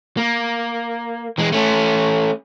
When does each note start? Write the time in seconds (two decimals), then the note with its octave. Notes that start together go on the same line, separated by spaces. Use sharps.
0.17 A#3
1.38 E3 G#3
1.52 A3 C#4